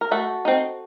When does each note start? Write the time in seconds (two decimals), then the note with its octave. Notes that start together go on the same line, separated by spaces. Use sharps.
0.01 A#4
0.11 A3 F#4 A4
0.45 C4 D#4